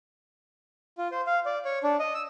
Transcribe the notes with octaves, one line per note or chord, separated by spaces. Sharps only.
F4
C5
F5
D5
C#5
D4
D#5
E6